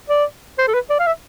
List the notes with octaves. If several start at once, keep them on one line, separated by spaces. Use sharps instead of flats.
D5
C5
A4
B4
D5
F5
E5